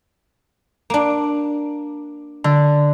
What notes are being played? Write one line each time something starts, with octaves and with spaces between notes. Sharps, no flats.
A#3 D4
D3